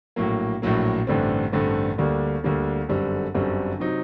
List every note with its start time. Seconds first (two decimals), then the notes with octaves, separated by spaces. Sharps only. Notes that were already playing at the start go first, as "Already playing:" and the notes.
0.16 A#1 A2 F#3 A#3
0.62 A#1 A2 F#3 A#3
1.07 A1 G2 D3 A3 C4
1.52 A1 G2 D3 A3 C4
1.98 D2 D3 G3 A#3 D4
2.44 D2 D3 G3 A#3 D4
2.89 G1 F#2 D3 G3 C4
3.34 G1 F#2 D3 G3 C4
3.79 C3 F#3 C4 D#4